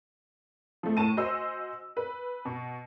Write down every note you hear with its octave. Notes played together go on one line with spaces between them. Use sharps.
F3 A3
A2 A5 D#7
F#4 C5 D#5 G#5 C6 E6
B4
B2